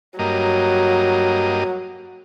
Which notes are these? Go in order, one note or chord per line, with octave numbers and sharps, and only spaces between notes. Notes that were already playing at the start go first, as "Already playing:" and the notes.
G2 F#3 A#3 D#5